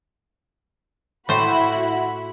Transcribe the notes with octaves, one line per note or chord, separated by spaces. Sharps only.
A2 E4 F#4 C5 B5